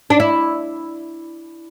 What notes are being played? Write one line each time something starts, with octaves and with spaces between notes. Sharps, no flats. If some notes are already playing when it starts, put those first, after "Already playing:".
D4
E4